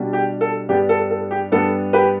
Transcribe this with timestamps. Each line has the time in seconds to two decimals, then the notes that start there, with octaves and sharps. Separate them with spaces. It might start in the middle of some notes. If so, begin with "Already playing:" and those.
Already playing: B2 G3 D4
0.13 G4
0.41 A4
0.69 G2 G3 B3 D4 G4
0.89 A4
1.10 A4
1.31 G4
1.52 G2 G3 B3 D4 A4
1.93 G4 B4